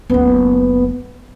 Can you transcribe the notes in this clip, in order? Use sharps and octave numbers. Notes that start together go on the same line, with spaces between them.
F#1 D2 B3